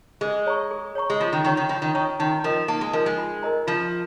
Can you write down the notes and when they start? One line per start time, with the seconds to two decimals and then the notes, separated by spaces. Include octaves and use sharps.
0.21 G#3 G#4
0.46 C#5 A#5 C#6
0.71 G#4
0.95 C#5 A#5 C#6
1.10 G#3
1.20 F3 F4
1.33 D#3
1.44 D#3 C#5 A#5 C#6
1.57 D#3
1.69 F3 F4
1.82 D#3
1.94 D#3 C#5 A#5 C#6
2.19 D#3 D#4
2.44 F3 A#4 D#5
2.68 A#3 D#4
2.81 G#3
2.93 F3 A#4 D#5
3.06 G#3
3.18 F4
3.43 A#4 D#5 A#5
3.67 F3 F4